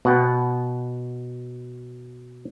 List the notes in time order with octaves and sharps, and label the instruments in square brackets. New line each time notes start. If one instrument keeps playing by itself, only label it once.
[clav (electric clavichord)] B2 F#5 G5